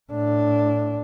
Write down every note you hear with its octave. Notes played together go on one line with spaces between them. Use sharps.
A2 D4